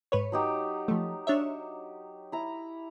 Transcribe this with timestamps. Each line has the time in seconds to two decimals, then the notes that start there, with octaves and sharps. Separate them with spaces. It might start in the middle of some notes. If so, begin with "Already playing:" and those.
0.12 G#2 B4 C#5
0.32 F#3 D#4 G4
0.88 F3 A3
1.27 D4 C#5 E5
2.32 E4 A#5